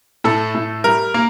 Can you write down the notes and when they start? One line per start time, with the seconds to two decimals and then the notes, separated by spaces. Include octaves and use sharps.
0.24 A2 A4
0.55 A2
0.84 G3 A#4
1.14 A#3